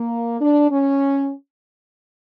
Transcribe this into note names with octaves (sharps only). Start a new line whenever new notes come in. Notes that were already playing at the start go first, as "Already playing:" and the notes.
Already playing: A#3
D4
C#4